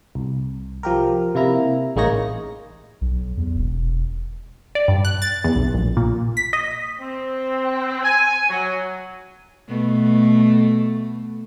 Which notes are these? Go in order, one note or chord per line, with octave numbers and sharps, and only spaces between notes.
C2
F3 G4 A#4
C3 A#3 E4 A#5
A1 G#3 A#3 D#4 C#5 A#6
B1
E2
E1
D5
G2
F#6
A6
E2
B1
A#1
A#2
B6
D#5
C4
G#5
F#3
B2 A3